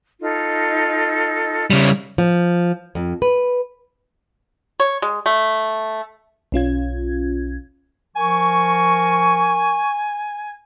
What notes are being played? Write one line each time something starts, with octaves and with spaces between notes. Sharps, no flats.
D#4 F4 A4
C#3 G3 C#5 E5 F5
F3
F2
B4
C#5
G#3
A3
B1 C#4 F4 G#6
F3 A#4 G#5 C#6